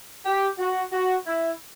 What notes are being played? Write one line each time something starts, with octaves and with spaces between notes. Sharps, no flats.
G4
F#4
F#4
E4